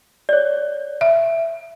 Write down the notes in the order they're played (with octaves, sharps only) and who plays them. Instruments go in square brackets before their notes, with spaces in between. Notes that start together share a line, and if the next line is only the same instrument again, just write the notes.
[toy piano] C#5 D5
[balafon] E5